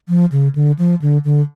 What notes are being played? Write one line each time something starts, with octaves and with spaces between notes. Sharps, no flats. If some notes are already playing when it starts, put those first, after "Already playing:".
F3
C#3
D3
F3
D3
D3